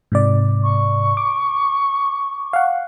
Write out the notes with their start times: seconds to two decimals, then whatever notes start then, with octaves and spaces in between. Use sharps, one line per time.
0.12 G#2 C3 D5
0.63 C#6
1.17 D6
2.53 F5 F#5